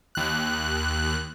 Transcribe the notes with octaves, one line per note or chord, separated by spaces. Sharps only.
D#2 F#6